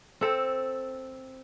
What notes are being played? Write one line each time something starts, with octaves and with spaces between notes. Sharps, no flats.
C4 A4